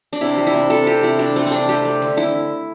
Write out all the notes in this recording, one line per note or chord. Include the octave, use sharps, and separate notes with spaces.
D4
C3 E4
G3
E4
C3
C3 A4
A3 G4
C3 E4
C3 D4
A3 C4
C4
C3 D4
A3 G4
A3
D3
D3 E4